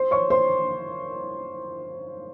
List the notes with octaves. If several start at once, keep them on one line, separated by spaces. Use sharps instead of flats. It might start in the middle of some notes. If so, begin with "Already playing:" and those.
Already playing: C5 C6
C#5 C#6
C5 C6